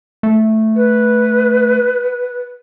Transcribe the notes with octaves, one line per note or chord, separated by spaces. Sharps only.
A3
B4